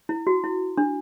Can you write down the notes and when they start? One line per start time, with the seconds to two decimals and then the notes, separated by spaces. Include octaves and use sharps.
0.09 E4
0.27 F#4
0.44 E4
0.78 D4